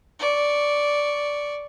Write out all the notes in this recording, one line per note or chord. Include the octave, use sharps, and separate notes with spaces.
D5 C#6